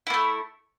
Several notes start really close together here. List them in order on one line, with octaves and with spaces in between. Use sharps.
E4 A#3 A3